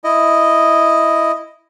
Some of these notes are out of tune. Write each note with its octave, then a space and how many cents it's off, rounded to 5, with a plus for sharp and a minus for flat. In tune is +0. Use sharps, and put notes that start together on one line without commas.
E4 +0 D#5 +0